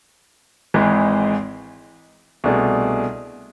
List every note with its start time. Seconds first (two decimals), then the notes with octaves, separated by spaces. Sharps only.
0.74 G#1 G#2 E3 G#3
2.44 C2 B2 A3 D4 G#4